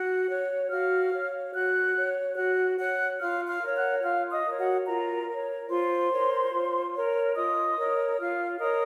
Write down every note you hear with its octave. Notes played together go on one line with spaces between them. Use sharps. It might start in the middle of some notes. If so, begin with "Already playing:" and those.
Already playing: F#4 F#5 F#6
C#5
F#4 F5 F6
C#5
F#4 F#5 F#6
C#5
F#4 F#5 F#6
C#5 F#5 F#6
F4 F5 F6
F5 F6
A#4 C#5
F#5 F#6
F4 F5 F6
D#5 D#6
A#4 C#5
F#4 F#5
F4 A#4 A#5
A#4 C#5
F4 C5 C6
A#4 C#5
F4
A#4 C#5
F4 D#5 D#6
A#4 C#5
F4 F5 F6
A#4 C#5 D#5 D#6